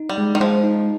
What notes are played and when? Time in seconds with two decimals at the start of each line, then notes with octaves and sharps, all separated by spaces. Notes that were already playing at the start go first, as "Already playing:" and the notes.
Already playing: D#4
0.09 G3
0.18 G#3
0.35 D#3
0.40 F3 G#3
0.63 D#4